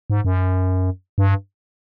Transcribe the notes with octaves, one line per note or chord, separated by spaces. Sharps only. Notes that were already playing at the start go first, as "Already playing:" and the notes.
G#2
F#2
G2